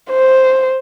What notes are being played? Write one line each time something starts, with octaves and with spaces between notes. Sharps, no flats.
C5